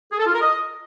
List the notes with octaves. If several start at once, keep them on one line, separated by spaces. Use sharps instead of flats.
G#4
A4
F4
A#4
D#5